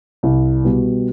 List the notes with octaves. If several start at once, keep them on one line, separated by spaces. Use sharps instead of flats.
C2
B2 G3